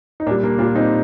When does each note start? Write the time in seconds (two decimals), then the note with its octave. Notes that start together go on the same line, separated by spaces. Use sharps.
0.20 D#4
0.26 A#2 A#3 D4
0.31 G3
0.43 A#3 D4
0.58 A#2 D4 F4
0.63 G3
0.75 C4 D#4